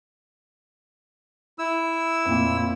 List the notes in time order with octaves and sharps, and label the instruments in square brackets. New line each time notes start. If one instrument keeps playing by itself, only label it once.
[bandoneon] E4 E6
[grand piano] F2 A#2